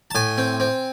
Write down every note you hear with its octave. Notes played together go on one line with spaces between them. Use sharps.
A5
A2 G#5
C4
C4